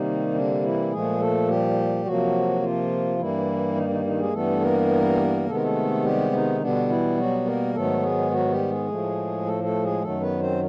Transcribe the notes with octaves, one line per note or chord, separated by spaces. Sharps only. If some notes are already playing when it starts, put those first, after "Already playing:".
Already playing: C3 D#3 G3 A#3 D#4
D3 D4
E3 E4
A#2 F3 G#3 A3 G#4
A3 A4
G3 G4
C3 F3 F#3 A#3 F#4
F3 F4
G2 E3 G3 A#3 E4
D#3 D#4
D#3 D#4
D#3 D#4
G#3 G#4
G2 E3 G3 A3 B3 A4
A#3 A#4
C3 D#3 G#3 B3 A4
A#4
A3 A4
G3 G4
D#3 D#4
B2 D3 G3 B3 D4
E3 E4
F#3 F#4
A#3 A#4
G#2 D#3 F#3 A3 B3 A4
G#3 G#4
F#3 F#4
G3 G4
G#3 G#4
A2 F3 A3
A3 A4
A3 A4
G#3 G#4
F#2 D#3 F#3 A3 A4
B3 B4
C4 C5